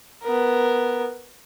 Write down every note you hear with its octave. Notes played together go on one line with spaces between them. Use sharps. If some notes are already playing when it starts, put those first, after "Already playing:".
B3 A#4